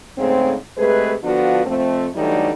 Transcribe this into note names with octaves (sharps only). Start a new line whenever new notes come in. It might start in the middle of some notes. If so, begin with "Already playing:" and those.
G#2 C#3 A3 C4
C3 G#3 A3 G#4 B4
D3 F3 B3 D4 F4 F#4
F2 A3 C4
D3 E3 F#3 G3 A3 D#4